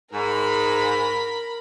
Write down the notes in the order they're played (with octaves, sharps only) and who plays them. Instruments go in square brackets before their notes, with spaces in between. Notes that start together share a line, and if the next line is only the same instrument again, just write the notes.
[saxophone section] G#2 [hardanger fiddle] A#4 B5